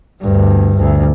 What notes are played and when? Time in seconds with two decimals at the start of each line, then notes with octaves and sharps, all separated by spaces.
0.21 D2 G2
0.77 D2